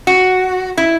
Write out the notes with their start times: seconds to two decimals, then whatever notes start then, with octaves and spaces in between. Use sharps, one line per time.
0.07 F#4
0.77 E4